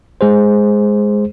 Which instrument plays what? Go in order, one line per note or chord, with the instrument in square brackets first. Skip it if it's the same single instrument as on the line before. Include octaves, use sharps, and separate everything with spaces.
[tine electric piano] G#3 G#4 C5